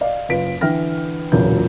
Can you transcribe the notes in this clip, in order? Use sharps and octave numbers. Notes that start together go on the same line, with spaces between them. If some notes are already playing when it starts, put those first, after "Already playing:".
D5 D#5 F5
F#1 F4 B4 B6 D7
D3 E3 G5 F6 A#6
E1 C#2 A#2 F#3 E4 G6